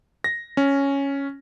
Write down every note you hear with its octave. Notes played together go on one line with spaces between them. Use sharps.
A#6
C#4